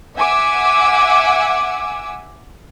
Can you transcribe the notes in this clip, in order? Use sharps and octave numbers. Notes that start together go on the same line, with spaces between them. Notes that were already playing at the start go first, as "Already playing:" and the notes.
E5 F#5 G#5 D6 E6